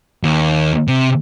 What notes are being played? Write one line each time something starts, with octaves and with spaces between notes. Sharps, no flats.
D#2
C3